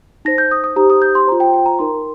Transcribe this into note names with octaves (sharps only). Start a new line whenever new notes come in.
D#4 C5 A#6
G6
D#6
D#6
D#4 G4 C5 A#5
D#6
G6
C6
F4 C5 A#5
G5
G5
A#5
D#4 A#4 C6